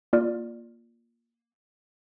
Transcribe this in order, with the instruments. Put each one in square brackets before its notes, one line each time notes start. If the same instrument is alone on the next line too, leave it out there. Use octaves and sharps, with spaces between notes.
[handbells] A#3 F4 D5 F6